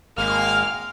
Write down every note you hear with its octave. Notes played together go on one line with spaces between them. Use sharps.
G#1 G#3 A#3 F5 F6